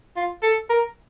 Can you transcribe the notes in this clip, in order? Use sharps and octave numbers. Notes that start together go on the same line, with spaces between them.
F4
A4
A#4